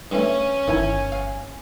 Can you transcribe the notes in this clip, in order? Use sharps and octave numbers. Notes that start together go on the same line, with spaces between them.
G2 A3 C#4
G1 D#3 E4 G#5
F5